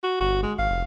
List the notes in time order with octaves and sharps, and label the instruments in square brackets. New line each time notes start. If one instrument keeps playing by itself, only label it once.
[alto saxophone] F#4
[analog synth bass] G1 [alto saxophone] F#4
[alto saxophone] G#3
[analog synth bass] G#1 [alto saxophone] F5
[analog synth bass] F1